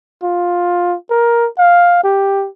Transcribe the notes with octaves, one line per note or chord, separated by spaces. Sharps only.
F4
A#4
F5
G4